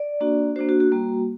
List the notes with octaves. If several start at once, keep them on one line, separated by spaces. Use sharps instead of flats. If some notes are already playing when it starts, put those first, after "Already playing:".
Already playing: D5
A#3 D4 F#4
A#3 D4 F#4 C5
F#4
F#4
G3 A#3 F#4